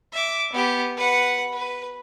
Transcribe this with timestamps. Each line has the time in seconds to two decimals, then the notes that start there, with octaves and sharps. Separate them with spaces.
0.13 E5 D6
0.53 B3 G4
0.97 B4 F#5
1.53 B4